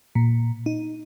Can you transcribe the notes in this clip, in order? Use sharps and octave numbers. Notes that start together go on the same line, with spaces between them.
A#2
D#4